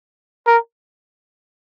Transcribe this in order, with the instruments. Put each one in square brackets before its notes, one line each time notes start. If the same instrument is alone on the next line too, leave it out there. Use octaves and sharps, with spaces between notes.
[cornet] A#4